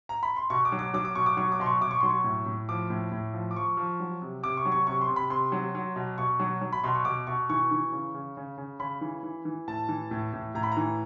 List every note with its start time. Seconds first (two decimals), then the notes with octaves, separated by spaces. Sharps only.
0.09 A#5
0.23 B5
0.36 C6
0.50 B2 C#6
0.65 D6
0.72 F#3
0.79 D6
0.94 F#3 D6
1.05 D6
1.15 B2 C#6
1.26 D6
1.37 F#3 C#6
1.52 D6
1.60 B2 C6
1.66 C#6
1.81 B2 D6
1.91 C#6
2.01 F#3 C6
2.10 C#6
2.24 A2
2.46 A2
2.69 F3 D6
2.90 A2
3.12 A2
3.34 F3
3.51 D6
3.56 F3 C#6
3.77 F3
4.00 F#3
4.22 C3
4.43 C3 D6
4.57 C#6
4.65 F#3
4.72 C#6
4.87 C3 C#6
5.01 C6
5.09 C3
5.16 B5
5.30 C3 C6
5.52 F#3
5.75 F#3
5.96 B2
6.18 B2 C#6
6.40 F#3
6.61 F#3
6.73 B5
6.84 B2 C6
6.95 C#6
7.05 B2 D6
7.27 B2 C#6
7.50 E3 C#6
7.71 E3
7.92 C#3
8.14 C#3
8.37 C#3
8.58 C#3
8.79 C#3 B5
9.01 E3
9.23 E3
9.45 E3
9.68 A2 A5
9.89 E3
10.11 A2
10.33 A2
10.55 A2 A#5
10.63 B5
10.72 A#5
10.77 E3